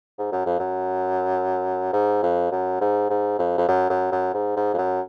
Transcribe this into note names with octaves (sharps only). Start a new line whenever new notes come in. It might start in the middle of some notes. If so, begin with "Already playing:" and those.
G#2
F#2
F2
F#2
G#2
F2
F#2
G#2
G#2
F2
F2
F#2
F#2
F#2
G#2
G#2
F2
F#2